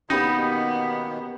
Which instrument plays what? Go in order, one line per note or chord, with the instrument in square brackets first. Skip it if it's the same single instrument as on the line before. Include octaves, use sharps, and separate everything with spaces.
[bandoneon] B2 D#3 A#3 [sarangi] B3 [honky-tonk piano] C#4 G4 B5 [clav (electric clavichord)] D#4